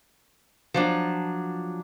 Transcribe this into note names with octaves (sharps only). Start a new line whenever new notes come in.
F3 F#3 D4